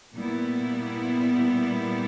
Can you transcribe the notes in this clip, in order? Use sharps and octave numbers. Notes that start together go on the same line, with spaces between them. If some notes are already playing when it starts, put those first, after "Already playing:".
A#2 G3 B3 E4